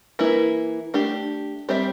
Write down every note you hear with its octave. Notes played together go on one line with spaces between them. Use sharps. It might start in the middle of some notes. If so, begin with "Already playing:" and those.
E3 A#3 E4
A3 D4 G4
G3 C4 G4 C5 E5